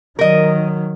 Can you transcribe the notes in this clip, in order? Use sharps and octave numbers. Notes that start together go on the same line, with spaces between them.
D#3 F#3 A#4 D#5